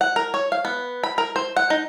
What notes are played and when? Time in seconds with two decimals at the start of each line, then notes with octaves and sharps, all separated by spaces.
0.01 F#5
0.16 A#4
0.34 C#5
0.52 F5
0.65 B3
1.04 B5
1.18 A#4
1.36 C5
1.56 F#5
1.70 D#4